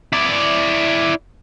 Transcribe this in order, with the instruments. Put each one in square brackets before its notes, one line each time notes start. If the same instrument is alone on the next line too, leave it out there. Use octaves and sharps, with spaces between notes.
[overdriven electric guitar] E4 D5